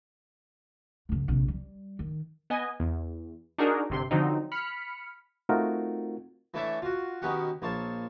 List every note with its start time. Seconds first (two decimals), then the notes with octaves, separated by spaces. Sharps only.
1.09 F#2 C#3
1.28 A#1 C3
1.48 G3
1.99 D#3
2.50 B3 D#5 G#5
2.80 E2
3.58 D4 D#4 F#4 G#4 A#4
3.90 G1 C3 C6
4.11 D3 F3 F#3 C4 D#4
4.52 B5 F6 B6 C#7
5.49 A3 C4 D#4 F4 F#4 A#4
6.54 E3 A3 D4 C#5 D5 E5
6.82 F4 F#4
7.22 B2 D#3 C#4 G4 F#5
7.62 A#1 F4 C#5 A5